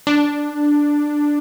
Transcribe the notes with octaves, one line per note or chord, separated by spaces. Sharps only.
D4